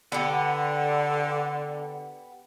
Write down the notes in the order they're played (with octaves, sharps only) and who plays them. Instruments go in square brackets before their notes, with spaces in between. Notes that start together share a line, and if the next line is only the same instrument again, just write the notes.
[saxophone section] D3 [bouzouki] B3 G4